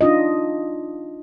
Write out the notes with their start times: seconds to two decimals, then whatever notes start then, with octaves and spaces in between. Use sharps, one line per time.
0.01 D4 D#4 F4 D#5